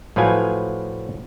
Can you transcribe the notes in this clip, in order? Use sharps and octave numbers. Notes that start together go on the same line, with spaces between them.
A2 F3 F#3 B4 F5 G#5